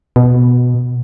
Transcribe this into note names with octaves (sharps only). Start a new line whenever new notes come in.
B2